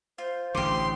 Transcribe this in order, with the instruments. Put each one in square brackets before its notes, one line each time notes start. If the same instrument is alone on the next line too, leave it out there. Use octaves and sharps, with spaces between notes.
[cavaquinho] F4 [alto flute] C5
[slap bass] A1 D3 [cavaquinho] G4 D6 [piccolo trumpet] C6